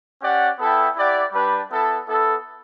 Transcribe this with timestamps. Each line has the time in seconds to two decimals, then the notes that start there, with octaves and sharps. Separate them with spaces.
0.22 C#4 G4 D5 F#5
0.59 B3 E4 A4 E5 G5
0.95 E4 G4 D5 F#5
1.32 G3 D4 G4 B4
1.70 B3 E4 A4
2.06 B3 E4 A4